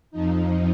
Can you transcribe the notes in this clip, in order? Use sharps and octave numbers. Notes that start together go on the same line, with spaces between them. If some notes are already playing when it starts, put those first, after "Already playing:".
F2 F3 D#4